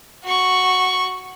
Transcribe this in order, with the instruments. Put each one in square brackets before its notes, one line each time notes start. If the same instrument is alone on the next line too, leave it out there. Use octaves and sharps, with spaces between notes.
[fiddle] F#4 C#6